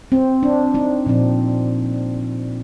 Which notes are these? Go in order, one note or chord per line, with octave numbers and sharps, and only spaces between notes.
C4
D4
C4 D#4
A#2 F3 C4